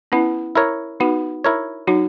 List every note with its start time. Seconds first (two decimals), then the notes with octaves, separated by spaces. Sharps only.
0.12 B3 C#4 E4
0.55 E4 A#4 C#5
1.00 B3 D#4 F#4
1.44 E4 A#4 C#5
1.87 F#3 D#4 F#4